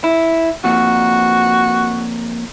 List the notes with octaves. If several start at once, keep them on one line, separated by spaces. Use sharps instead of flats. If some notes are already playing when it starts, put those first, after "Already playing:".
E4
F2 A#2 F#4